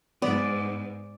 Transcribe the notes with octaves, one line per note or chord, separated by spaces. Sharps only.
G#2 B3 D5